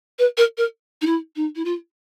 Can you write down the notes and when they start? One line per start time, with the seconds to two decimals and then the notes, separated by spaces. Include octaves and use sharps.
0.18 B4
0.37 A#4
0.57 A#4
1.01 D#4
1.06 E4
1.36 D#4
1.55 E4
1.65 F4